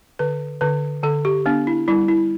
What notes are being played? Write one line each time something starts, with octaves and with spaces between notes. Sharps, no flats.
D3 B4
D3 B4
D3 A4
G4
B3 D4
E4
G3 E4
E4